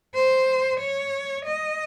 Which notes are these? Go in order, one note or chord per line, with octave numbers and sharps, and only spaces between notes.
C5
C#5
D#5